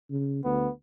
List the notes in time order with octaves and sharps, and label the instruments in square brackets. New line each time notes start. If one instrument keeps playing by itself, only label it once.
[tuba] C#3
[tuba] D2 [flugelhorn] B3